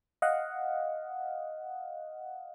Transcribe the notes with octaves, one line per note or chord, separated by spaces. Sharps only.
D#5 F5 F#5